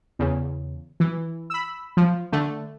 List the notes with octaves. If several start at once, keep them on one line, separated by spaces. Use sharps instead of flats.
E2 C#3
E3
B5 E6
F3
D3 A3